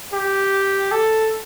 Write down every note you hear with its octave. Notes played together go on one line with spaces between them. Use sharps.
G4
A4